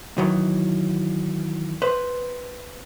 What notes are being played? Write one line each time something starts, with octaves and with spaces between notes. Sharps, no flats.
D#3 E3 F#3
B4 C5